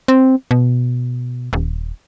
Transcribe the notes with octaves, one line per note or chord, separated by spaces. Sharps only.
C4
B2
D#1